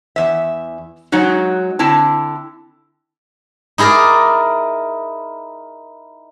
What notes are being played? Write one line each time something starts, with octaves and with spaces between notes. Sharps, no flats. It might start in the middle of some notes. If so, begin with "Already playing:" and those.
E2 E5
F#3 G#3 D#4 F#4
D3 C4 E4 A5
D#4 E4 G#4 A#4 D5